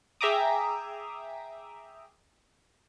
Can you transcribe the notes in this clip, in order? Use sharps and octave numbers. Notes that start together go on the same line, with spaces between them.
G#4 E5 G5 A#5 D6 D#6